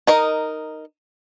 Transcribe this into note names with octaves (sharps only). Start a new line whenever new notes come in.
D#4 A#4 D#5